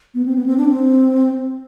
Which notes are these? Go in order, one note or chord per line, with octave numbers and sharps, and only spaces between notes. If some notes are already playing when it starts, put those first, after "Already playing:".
B3
C4
B3
C4
D4
C4